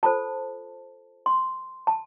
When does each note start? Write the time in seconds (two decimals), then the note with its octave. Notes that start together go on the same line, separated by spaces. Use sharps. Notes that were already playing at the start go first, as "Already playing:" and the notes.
0.03 F4 A4 C5 A5
1.26 C6
1.87 A5